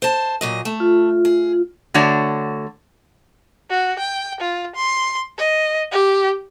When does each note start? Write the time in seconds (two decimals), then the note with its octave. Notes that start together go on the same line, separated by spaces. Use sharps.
0.02 C5 A5
0.41 A#2 F#3 D#5
0.65 A3
0.80 F4
1.25 G#4
1.94 D3 A3 F#4 C#5 D5
3.70 F#4
3.99 G5
4.40 F4
4.76 C6
5.38 D#5
5.92 G4